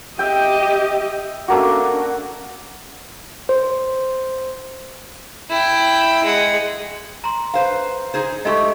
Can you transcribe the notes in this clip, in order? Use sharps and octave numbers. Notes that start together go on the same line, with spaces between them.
G4 D#5 E5 G5
A3 A#3 C#4 D4 F#4
C5
E4 G5
G#3 F#5
A#5 C6
B4 C5 F5
D#4 G#4 C5
G#3 A3 G4 D#5 C#6